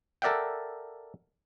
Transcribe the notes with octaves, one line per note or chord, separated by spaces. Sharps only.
A4 A#4 D5 E5 F#5 G5